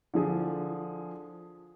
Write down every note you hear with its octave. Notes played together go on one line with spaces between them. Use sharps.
D3 F3 G#4